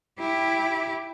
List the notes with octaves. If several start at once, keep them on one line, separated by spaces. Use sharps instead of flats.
E4 G4